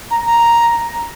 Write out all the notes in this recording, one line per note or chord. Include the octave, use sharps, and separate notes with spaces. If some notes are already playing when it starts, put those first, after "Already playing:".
A#5
A#5